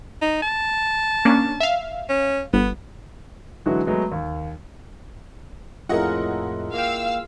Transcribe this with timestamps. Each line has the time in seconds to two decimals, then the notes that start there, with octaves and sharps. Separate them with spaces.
0.22 D#4
0.42 A5
1.25 A#3 C#4 D4
1.60 E5 F5
2.09 C#4
2.53 G1 B3
3.66 D3 E3 F#3 G#3 E4 F#4
3.86 F#3 G#3 A3 B3
4.12 D#2
5.89 F2 A2 E4 F4 G#4 A#4 D#5 F#5
6.74 A#3 F5 G5 E6